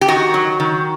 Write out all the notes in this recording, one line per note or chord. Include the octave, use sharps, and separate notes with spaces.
G4
D#3 F#4
F#3
D#3